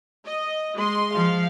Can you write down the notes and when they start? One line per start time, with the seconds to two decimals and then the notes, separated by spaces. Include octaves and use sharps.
0.25 D#5
0.75 G#3 D#5 C6
1.15 F3 F5